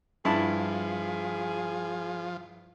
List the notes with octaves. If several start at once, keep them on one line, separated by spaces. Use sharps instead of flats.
G2 F3 E4 G#4 A5